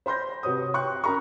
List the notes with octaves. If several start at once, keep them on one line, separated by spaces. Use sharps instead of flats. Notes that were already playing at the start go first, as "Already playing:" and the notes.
C5 B5 C6 G6 A#6
C3 F#4 B4 C#5 D#6
G5 C6 C#6 F#6
C#4 F#4 A#4 A#5 B5 C#6